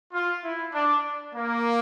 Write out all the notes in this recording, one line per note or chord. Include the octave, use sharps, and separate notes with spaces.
F4
E4
D4
A#3